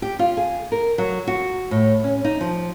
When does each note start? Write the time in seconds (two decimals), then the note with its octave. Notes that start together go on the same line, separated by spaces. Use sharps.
0.02 G4
0.19 F4
0.37 G#4
0.72 A#4
0.98 F#3
1.27 F#4
1.71 A2
2.04 C#4
2.25 D#4
2.41 F3